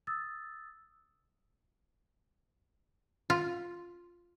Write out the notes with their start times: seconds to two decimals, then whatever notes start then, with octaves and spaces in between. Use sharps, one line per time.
0.07 D#6 E6 A6
3.30 F4